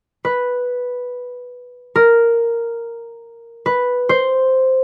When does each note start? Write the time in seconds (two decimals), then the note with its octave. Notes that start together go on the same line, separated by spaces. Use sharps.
0.25 B4
1.95 A#4
3.66 B4
4.09 C5